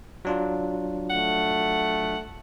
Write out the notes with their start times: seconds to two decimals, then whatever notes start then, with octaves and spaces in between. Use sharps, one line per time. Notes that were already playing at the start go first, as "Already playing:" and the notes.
0.25 F#3 D4 F4
1.10 A3 F#5